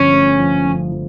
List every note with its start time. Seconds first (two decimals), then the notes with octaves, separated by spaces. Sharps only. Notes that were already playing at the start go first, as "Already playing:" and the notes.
Already playing: G1 F3 C#4
0.14 A3
0.39 F3
0.66 F3
0.92 F3